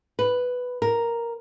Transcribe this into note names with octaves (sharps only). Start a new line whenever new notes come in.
B4
A#4